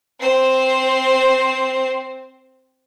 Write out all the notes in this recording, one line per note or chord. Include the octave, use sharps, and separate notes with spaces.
C4 C5